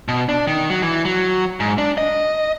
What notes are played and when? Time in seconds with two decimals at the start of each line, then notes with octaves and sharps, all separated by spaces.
0.08 B2
0.29 D4
0.47 D#3
0.70 F#3
0.82 E3
1.05 F#3
1.60 G#2
1.78 D4
1.98 D#5